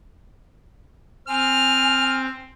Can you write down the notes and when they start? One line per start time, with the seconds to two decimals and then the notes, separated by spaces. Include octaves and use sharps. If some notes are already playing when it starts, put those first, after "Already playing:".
1.28 C4 G#5 F6